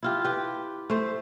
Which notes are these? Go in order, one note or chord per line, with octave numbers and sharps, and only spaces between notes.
E4 F4 G4
G4 B4
A3 C5